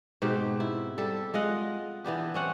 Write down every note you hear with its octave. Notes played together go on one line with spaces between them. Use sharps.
G#2 B2 C4 G4
E4
G3 A4
G#3 F4 D#5 F#5
E3 B3 D4 G4
C4 C#4 F#5